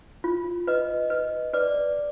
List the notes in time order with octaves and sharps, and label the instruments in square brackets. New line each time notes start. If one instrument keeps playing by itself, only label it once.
[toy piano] F4
[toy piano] B4 [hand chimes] D#5
[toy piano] B4
[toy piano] B4 [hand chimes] D5